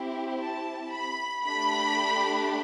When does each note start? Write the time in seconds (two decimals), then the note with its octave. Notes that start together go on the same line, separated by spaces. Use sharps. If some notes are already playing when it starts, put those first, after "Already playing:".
Already playing: C4 E4 G4
0.39 A5
0.91 B5
1.44 A3 D4 G4 B5